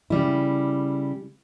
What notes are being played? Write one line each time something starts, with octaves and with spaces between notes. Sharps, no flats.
C#3 G3 E4